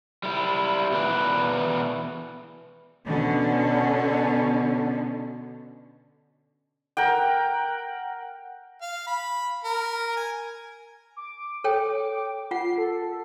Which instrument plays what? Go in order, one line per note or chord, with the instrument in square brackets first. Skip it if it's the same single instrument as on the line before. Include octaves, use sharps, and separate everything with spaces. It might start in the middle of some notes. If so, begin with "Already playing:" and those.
[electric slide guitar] G3 E4
B2 E3 C4 B4 D5
[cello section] B2 D3 C#4
[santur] A#4 F#5 G5
[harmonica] F5
B5
A#4
G#5
[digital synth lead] D6
[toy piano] A4 C#5 G5
[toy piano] F4 F#5 [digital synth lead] C7
[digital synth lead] A4